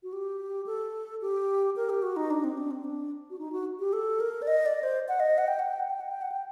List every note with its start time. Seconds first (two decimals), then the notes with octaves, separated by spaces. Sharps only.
0.03 F#4
0.13 G4
0.66 A4
1.21 G4
1.76 A#4
1.89 G4
2.02 F#4
2.16 D#4
2.30 D4
2.44 C4
2.57 D4
2.71 C4
2.84 D4
3.30 F#4
3.39 D#4
3.52 F#4
3.79 G4
3.93 A4
4.20 A#4
4.42 D5
4.47 D#5
4.66 D5
4.83 C5
5.08 F#5
5.20 D#5
5.38 F#5
5.48 G5
5.59 F#5
5.69 G5
5.79 F#5
5.90 G5
6.01 F#5
6.11 G5
6.22 F#5
6.32 G5